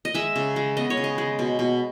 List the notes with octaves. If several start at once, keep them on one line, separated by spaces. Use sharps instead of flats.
D#5
G#3 E5
C#3
G#3
B3 D#5
C#5
C#3
D#5
G#3
B2
B2